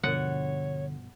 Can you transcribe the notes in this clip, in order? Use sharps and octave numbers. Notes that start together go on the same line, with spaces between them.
G2 B2 D3 F3 C#5 F#5